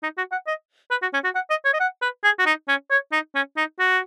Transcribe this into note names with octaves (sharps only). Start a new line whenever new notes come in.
D#4
F#4
F#5
D#5
B4
F#4
C#4
F#4
F#5
D#5
C#5
D#5
F#5
B4
G#4
F#4
D#4
C#4
C#5
D#4
C#4
D#4
F#4